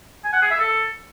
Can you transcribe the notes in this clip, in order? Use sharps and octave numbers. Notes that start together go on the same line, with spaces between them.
G#5
F#5
G#4
E5
A4